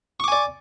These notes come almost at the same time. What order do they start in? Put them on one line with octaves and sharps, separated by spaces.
C#6 D6 G#5 D5